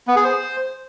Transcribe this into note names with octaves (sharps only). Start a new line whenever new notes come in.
B3
G#4
C5